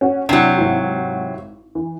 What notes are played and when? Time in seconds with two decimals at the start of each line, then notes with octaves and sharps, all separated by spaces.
0.01 C#4 F#4
0.29 C3 F#3 D4 E4
0.56 G#1 E4 F#4
1.75 E3